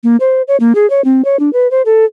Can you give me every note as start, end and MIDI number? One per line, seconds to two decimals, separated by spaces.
0.03 0.17 58
0.20 0.42 72
0.48 0.57 73
0.60 0.73 58
0.75 0.89 68
0.90 1.04 73
1.05 1.24 60
1.25 1.39 73
1.39 1.52 62
1.53 1.70 71
1.71 1.82 72
1.86 2.05 69